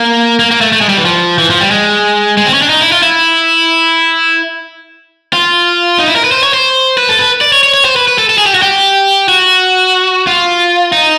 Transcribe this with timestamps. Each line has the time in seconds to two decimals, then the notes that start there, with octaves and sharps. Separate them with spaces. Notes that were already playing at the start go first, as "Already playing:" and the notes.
Already playing: A#3
0.39 A#3
0.51 A#3
0.61 A3
0.73 A3
0.81 G#3
0.89 G3
0.97 E3
1.05 F3
1.39 E3
1.50 F3
1.61 G3
1.71 G#3
2.37 G#3
2.46 C4
2.54 C#4
2.62 D4
2.70 D#4
2.81 E4
2.92 F4
3.03 E4
5.33 F4
5.99 D#4
6.08 E4
6.16 A#4
6.24 B4
6.32 C5
6.43 C#5
6.54 C5
6.97 B4
7.09 A4
7.19 B4
7.41 D5
7.53 C#5
7.63 C#5
7.74 C#5
7.85 C5
7.96 B4
8.08 B4
8.18 A4
8.29 A4
8.38 G#4
8.46 G4
8.55 F#4
8.62 G4
9.29 F#4
10.27 F4
10.93 D#4